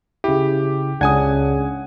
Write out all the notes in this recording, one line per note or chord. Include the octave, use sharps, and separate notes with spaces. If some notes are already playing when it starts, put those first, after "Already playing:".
C#3 E4 G4
C#2 C#3 D4 F#5 G#5 D#6 G#6